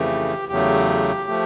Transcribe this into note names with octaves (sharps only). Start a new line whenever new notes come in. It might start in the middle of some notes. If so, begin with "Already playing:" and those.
Already playing: F2 C#3 E3 A3 G4
E2 C#3 F#3 A3 G4
F3 A3